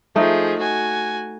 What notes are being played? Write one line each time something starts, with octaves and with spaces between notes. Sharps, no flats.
F3 A3 D#4 G#4
F#4 G#5